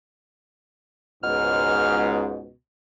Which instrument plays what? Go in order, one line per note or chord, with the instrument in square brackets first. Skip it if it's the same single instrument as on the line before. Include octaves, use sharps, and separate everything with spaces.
[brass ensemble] C#2 G#2 [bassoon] B2 [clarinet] F6